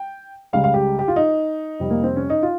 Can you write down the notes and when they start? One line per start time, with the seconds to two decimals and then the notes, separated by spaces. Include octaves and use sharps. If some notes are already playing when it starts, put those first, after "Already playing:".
Already playing: G5
0.53 C#2 C#3 G3 F5
0.64 F5
0.74 G4
0.99 G4
1.08 F4
1.16 D#4
1.80 F2 C3 G3
1.91 A#3
2.04 C4
2.16 C#4
2.30 D#4
2.43 F4